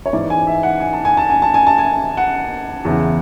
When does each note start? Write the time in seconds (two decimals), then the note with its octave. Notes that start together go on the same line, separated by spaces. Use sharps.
0.06 C#5
0.13 G#2 E3 D5
0.30 G#5
0.47 E5
0.63 F#5
0.80 G#5
0.93 A5
1.05 G#5
1.17 A5
1.30 G#5
1.42 A5
1.54 G#5
1.67 A5
1.78 G#5
2.17 F#5
2.85 E2 C#3 E3